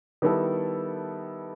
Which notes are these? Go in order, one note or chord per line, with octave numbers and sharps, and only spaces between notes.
D#3 G3 B3 E4 A4